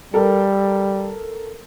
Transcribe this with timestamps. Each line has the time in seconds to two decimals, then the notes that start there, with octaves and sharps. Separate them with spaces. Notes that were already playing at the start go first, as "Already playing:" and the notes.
0.14 G3 A4 A#4